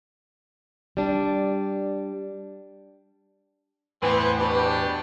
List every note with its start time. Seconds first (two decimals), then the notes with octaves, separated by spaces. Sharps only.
0.97 G3 D4
4.02 E2 A2 E3 B3 C4 B4 G#5
4.39 B2 D4 G4